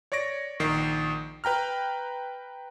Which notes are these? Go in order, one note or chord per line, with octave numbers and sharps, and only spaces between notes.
C#5 D5 C#6 A#6 D7
A#1 D#3 C7
B4 G5 A#5 F6